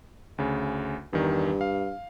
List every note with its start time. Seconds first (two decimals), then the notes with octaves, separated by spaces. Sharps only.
0.38 D2 C#3
1.13 E2 G2 D#3
1.61 F5